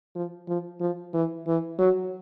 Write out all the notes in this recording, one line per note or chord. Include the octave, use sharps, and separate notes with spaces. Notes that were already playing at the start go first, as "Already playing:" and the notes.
F3
F3
F3
E3
E3
F#3